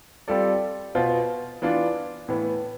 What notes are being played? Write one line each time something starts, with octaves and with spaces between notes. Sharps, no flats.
G3 C4 F4 A4 D5
B2 B3 F4 C5
E3 B3 D4 F4
A2 E3 B3